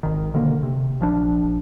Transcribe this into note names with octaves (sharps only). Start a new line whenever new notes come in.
G#1 D#3
B2 D3 D#3 A#3
C3
A#1 F3 D4